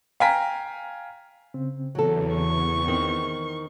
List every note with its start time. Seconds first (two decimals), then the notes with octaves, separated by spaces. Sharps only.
0.20 F5 G5 G#5 A#5 B6
1.54 C#3 C4
1.95 E2 F#3 A4
2.35 C#6
2.87 D#3 C4